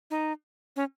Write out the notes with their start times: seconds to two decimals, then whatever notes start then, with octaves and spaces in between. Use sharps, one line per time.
0.11 D#4
0.76 C#4